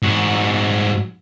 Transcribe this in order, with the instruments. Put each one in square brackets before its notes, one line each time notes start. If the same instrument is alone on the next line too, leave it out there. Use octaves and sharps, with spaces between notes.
[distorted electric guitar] G#2 F#4